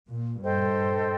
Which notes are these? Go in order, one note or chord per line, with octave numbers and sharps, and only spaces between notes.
A#2
G2 A4 C5 D#5 G5